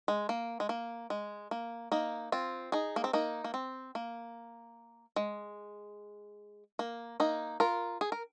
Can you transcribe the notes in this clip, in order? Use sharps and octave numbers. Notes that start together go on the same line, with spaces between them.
G#3
A#3
G#3
A#3
G#3
A#3
A#3 D#4
C4 F4
D#4 G#4
A#3
C4
A#3 D#4
A#3
C4
A#3
G#3
A#3
A#3 D#4
F4 A#4
G#4
A#4